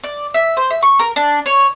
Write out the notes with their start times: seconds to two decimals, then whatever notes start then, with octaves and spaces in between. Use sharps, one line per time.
0.04 D5
0.34 E5
0.57 C5
0.70 E5
0.82 C#6
0.99 A#4
1.16 D4
1.46 C#5